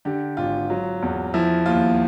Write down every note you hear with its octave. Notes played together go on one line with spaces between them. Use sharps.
D3 G4
G#1 F4
F#3
E2
F3 E4
D#2 F4